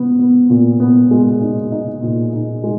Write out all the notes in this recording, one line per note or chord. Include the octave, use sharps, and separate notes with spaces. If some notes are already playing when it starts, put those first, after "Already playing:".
Already playing: B3
B3
A#2
B3
G#3
D#4
D#4
A#2
D#4
G#3